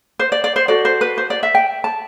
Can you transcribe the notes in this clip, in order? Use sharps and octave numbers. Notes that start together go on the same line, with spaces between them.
C5
D5
D5
C5
F#4 A4 D5
C5
B4
C5
D5
E5
G5
A5